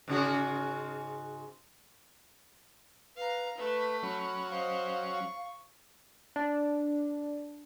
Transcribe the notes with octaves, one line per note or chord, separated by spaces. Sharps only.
G#2 C#3 F#4
B4 F5 A#5
A3 B4
F#3 C#4 B5
C5 D#5 F5
C#6
D4